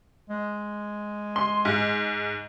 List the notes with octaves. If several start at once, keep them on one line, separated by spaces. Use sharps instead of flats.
G#3
C6
G#2